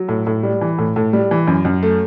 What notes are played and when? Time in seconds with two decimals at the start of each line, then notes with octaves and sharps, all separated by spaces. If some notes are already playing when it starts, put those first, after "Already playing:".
Already playing: F#3
0.08 A2
0.26 A2
0.43 G3
0.61 E3
0.78 A2
0.96 A2
1.13 G3
1.31 E3
1.47 F#2
1.65 F#2
1.83 A3